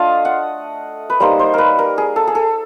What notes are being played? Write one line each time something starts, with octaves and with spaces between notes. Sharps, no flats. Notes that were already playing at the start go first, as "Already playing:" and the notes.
Already playing: A3 D4 F4 D#5 F5
F#5
B4
G3 A#3 D#4 C5
C5
A#4 B4
A#4
G#4
A4
G#4
A4